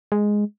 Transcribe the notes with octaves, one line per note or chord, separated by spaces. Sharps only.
G#3